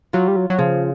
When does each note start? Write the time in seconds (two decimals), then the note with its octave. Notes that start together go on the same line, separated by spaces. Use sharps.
0.13 F#3 F4
0.28 G3
0.36 F#3
0.50 F#3
0.59 C#3 F3